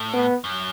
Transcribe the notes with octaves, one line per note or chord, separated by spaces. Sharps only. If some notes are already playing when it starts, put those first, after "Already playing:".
Already playing: A2
B3
F#2